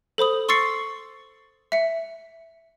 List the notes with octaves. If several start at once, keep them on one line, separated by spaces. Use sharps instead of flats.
A4 C5 B5 D#6
C6 C#6 E6 A6 C7 C#7
E5 C#7